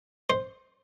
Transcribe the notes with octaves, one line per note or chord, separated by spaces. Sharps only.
C5